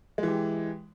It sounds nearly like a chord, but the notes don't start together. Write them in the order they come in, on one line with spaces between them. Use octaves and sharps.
G#3 E3 G4